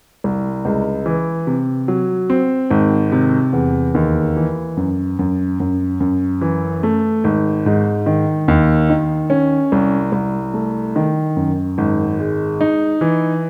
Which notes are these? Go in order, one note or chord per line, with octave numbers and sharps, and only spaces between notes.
C2
C#2
E3
C3
F#3
C4
G#1
C3
E2
D#2
E3
F#2
F#2
F#2
F#2
E3
A3
G#1
G#2
D#3
D#2
D#3
C#4
C2
C2
A3
D#3
F#2
G#1
G#3
D#4
E3